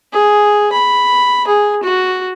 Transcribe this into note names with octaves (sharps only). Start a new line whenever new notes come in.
G#4
B5
G#4
F#4